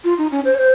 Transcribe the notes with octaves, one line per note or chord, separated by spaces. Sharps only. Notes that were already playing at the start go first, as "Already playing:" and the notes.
F4
D#4
C#4
C5
C#5
C5